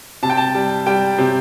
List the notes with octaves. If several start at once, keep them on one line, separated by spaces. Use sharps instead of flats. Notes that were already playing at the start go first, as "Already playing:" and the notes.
C3 A5
G5
A5
G3
G3 G5
C3